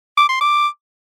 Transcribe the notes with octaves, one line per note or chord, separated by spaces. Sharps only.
D6
C6
D6